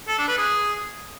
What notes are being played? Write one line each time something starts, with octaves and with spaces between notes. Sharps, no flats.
A4
D4
B4
G#4